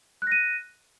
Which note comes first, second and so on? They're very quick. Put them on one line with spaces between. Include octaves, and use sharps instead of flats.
F#6 A#6 D#7